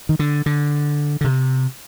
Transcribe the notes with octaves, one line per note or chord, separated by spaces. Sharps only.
D#3
D3
D3
D3
C3